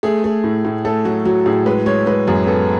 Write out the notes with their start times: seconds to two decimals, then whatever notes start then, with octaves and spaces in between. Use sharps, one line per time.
0.03 A3 G#4
0.24 A3
0.44 A2
0.65 A2
0.85 A3 A4
1.05 F#3 F#4
1.25 F#3 F#4
1.46 A2 G#4
1.66 G#3 B4
1.86 G#3 C#5
2.06 G#3 B4
2.27 F#2 G#4
2.47 B3 A4